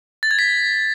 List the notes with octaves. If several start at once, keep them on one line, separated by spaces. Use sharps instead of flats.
A6
G#6
B6